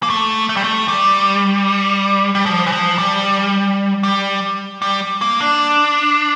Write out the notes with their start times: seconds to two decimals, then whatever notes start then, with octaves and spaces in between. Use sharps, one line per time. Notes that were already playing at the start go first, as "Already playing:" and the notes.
0.03 A#3
0.10 A3
0.49 A3
0.57 G3
0.64 A3
0.88 G3
2.35 G3
2.46 F3
2.67 E3
2.72 F3
2.98 G3
4.03 G3
4.82 G3
5.21 A#3
5.41 D4